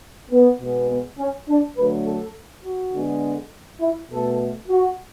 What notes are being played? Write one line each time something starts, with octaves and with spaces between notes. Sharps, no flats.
B3
B2 G#3 B3
B3
C#4
D4
D3 F#3 A3 B4
A4
F#4
D3 G#3 B3
E4
B2 A3 A4
F#4